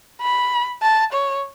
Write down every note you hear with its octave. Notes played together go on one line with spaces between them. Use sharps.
B5
A5
C#5